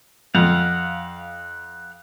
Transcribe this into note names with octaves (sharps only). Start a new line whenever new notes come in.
F2 F5 F#5